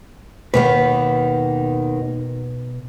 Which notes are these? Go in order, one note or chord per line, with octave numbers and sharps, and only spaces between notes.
D#2 B2 D#3 B3 B4